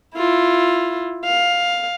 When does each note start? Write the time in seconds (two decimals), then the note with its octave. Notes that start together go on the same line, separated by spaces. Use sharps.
0.16 E4 F4
1.25 F5